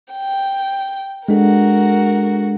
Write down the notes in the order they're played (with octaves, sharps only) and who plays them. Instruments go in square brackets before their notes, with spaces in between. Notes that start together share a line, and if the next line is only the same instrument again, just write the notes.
[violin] G5
[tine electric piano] G#3 D4 A4 [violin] F#4 A#4